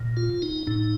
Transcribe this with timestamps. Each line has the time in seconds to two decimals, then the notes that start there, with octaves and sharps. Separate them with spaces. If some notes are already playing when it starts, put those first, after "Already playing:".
Already playing: A#2
0.17 F4
0.42 D#4
0.67 A2 D#4